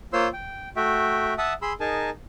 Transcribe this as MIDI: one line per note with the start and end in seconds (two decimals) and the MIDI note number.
0.13 0.28 58
0.13 0.28 65
0.13 0.28 72
0.13 0.28 73
0.13 0.28 84
0.13 0.28 88
0.33 0.69 79
0.76 1.34 57
0.76 1.34 66
0.76 1.34 76
0.76 1.34 79
1.38 1.53 76
1.38 1.53 78
1.38 1.53 81
1.38 1.53 87
1.38 1.53 88
1.62 1.73 68
1.62 1.73 83
1.62 1.73 84
1.62 1.73 88
1.80 2.10 63
1.80 2.10 68
1.80 2.10 70
1.80 2.10 80
1.80 2.10 81